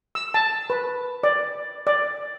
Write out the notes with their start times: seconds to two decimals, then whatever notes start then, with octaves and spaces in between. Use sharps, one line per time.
0.15 E6
0.34 A5
0.70 B4
1.23 D5
1.87 D5